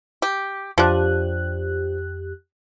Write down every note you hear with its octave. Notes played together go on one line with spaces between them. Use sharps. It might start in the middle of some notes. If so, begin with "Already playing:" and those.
G4
F2 F3 D4 G4 F#6